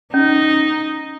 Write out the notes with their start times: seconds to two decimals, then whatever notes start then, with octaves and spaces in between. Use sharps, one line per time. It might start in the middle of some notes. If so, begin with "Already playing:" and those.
0.14 C#4 D#4